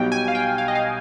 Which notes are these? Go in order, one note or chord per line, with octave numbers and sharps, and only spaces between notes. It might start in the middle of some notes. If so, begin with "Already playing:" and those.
Already playing: B1 B2 G3 G5
G#5
F5
G5
F5
D#5
F5